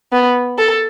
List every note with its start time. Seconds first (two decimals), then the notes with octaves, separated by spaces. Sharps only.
0.13 B3
0.58 A4